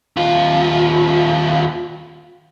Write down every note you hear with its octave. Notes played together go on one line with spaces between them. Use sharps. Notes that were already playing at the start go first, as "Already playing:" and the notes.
D#2 F4